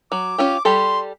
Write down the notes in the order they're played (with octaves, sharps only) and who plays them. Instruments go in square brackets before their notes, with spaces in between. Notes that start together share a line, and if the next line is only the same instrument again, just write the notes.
[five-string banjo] F#3 [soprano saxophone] D6
[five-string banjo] C#4 F4 G4
[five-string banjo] G3 G4 A4 [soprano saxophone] C6